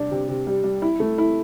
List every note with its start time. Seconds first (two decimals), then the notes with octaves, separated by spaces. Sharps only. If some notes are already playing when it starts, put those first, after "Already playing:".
Already playing: C3 G3 D4
0.11 C3
0.29 C3
0.47 G3
0.64 G3
0.82 E4
1.00 A3
1.18 E4